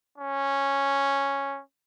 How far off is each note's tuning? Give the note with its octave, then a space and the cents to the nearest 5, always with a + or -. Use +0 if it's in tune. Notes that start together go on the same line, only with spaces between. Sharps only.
C#4 -5